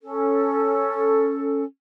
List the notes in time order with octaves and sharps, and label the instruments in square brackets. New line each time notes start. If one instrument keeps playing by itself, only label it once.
[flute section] C#4 A4